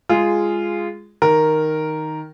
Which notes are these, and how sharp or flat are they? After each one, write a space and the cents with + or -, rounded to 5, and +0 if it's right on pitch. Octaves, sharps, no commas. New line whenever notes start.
G#3 -10 F4 -10 G#4 +0
D#3 +0 A#4 +0